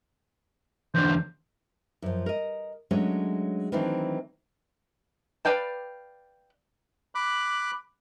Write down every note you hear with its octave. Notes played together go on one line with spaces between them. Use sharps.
E2 D3 C5
F#2 F3
A#4 D#5
F#3 G#3 A3 C#4 D4
D#3 E3 F#3 A3 C4 D4
B4 D5 F5 G5 A5
B5 D6 F#6